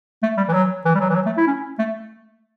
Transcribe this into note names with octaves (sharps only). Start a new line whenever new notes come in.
A3
G3
E3
F#3
E3
G3
F#3
E3
F#3
A3
E4
C#4
A3